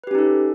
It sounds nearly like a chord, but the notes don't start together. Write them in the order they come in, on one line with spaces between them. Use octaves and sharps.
B4 G4 C#4 D#4 A4